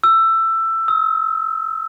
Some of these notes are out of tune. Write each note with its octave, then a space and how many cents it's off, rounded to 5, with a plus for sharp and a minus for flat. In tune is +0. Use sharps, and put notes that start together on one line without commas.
E6 +15
E6 -45